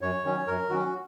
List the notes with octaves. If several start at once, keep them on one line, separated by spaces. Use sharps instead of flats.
F#2 C#5
D#3 F#3 C#4
F#2 A#4
D#3 F#3 C#4 F#4